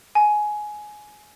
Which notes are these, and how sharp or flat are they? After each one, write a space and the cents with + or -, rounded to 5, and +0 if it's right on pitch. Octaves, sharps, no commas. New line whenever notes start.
G#5 +15